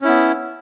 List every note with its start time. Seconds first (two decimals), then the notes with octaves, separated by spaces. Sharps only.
0.02 C#4
0.05 E4
0.08 B3